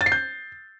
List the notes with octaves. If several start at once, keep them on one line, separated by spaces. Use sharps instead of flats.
A6
C7
G6